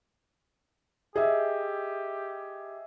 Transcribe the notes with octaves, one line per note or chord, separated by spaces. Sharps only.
G4 G#4 D#5 E5